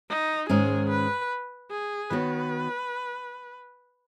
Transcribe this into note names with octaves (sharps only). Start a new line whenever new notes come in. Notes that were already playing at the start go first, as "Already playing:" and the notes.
D#4
G#2 D#3 G#3 C#4 G#4
B4
G#4
D#3 B3 F#4 B4 C#5